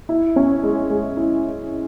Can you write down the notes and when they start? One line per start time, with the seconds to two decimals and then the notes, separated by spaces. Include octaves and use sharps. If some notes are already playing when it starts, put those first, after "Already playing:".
0.09 E4
0.36 C#4
0.63 G#3
0.90 G#3
1.17 E4